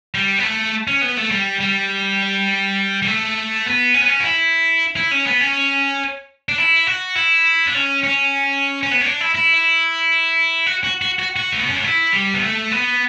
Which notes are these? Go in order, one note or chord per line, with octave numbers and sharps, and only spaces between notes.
G3
B3
A3
C#4
B3
A3
G3
G3
G3
A3
B3
C#4
B3
C#4
F#4
E4
E4
C#4
B3
C#4
D4
E4
F#4
E4
D4
C#4
C#4
C#4
B3
C#4
D4
E4
E4
F#4
F#4
F#4
F#4
F#4
A3
B3
C#4
D4
E4
G3
B3
A3
B3